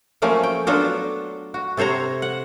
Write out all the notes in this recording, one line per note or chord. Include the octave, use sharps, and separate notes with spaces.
F3 F#3 A3 A#3 C#4
G5
F#3 B3 D4 F4 F#4 A4
F#4
C3 A4 C5 C#5 A#5
F#5